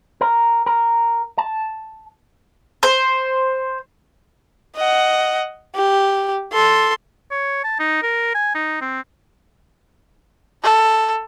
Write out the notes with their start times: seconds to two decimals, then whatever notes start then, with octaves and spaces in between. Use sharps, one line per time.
0.21 A#4
0.66 A#4
1.38 A5
2.83 C5
4.76 D#5 F#5
5.75 G4
6.53 A4 C6
7.31 C#5
7.64 A5
7.79 D#4
8.02 A#4
8.34 G#5
8.55 D#4
8.81 C4
10.63 A4